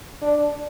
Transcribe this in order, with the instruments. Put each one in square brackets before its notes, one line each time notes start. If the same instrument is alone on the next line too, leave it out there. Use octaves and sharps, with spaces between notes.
[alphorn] D4